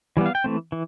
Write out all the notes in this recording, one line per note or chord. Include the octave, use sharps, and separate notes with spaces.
E3 G3 B3
F5
G5
E3 A3 C4
E3